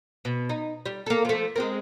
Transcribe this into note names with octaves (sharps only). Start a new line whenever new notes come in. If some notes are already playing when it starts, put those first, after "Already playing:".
B2
D#4
G3
A#3 A4
F3 A3
G#3 C4 A#4